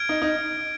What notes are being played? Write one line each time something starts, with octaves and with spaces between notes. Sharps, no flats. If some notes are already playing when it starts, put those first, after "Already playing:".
Already playing: F6 G#6 D7
D#4
D#4